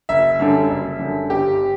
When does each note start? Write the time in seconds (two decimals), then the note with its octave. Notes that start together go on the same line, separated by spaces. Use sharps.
0.09 F#1 E5
0.40 F#2 D3 G3
0.70 F#1
0.99 F#2 D3 G3
1.30 G1 G4